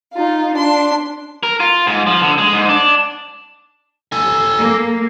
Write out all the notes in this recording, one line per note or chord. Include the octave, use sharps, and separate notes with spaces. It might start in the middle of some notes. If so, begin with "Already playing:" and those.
D#4 F4
D4 C6
A#4
F4
G#2
F3
D3
G#3
G#2
D4
A4 G#5
A#3